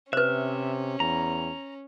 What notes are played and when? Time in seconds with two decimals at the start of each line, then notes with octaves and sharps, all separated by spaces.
0.13 C3 C#4 B4 C5 E5
1.00 E2 A#5